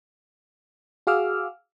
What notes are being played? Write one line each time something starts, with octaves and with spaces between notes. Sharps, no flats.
F#4 G#4 F5 D6 E6 F6